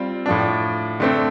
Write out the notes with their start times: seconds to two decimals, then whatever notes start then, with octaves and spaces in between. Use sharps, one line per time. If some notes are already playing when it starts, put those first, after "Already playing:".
Already playing: G3 C4 F4
0.26 A2 F3 D4
1.00 D3 A3 C4